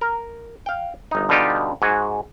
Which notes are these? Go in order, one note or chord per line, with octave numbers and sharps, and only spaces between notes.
A#4
F5 G5
G1 D#4
B2 D3 G3 D#4 F4 G4
G#2 F#4 G#5